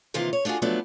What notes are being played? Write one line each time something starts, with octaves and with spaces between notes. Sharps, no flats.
C3 D#3 E3 A#3 F4 A#4
C#5
A3 D4 F4 F#4 G#4
F3 F#3 A3 B3 D4